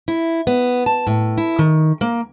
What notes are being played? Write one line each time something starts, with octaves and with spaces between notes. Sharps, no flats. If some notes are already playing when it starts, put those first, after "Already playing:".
E4
B3
A5
A2
E4
D#3
A#3